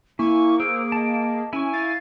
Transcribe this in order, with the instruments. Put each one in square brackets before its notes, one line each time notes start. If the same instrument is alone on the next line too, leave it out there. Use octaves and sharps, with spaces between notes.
[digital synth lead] A#3 [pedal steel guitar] E4 [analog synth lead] G#5 [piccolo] C#6
[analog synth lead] G#4 [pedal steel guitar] A#4 C5 E6 [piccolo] D7
[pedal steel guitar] D#5 A5
[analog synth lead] C#4 [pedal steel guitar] E4 C#6 [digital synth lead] G#5
[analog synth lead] F5 [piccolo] A6